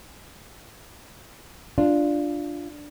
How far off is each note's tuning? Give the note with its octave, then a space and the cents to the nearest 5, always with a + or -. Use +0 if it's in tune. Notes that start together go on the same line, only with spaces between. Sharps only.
D4 +0 F4 -5